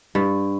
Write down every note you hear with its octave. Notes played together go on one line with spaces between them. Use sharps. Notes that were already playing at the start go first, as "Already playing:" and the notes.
G2